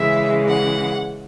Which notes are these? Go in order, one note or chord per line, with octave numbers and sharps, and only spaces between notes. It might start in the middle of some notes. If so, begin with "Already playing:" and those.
Already playing: C#3 E3 G#3 E5
F#5